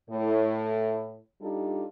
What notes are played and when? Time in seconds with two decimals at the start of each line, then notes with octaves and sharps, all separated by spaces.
0.10 A2
1.41 G3 D4 D#4 F4 G4 A4